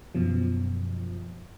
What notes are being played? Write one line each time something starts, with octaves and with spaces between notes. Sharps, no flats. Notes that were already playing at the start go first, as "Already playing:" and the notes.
F#2 B2 F3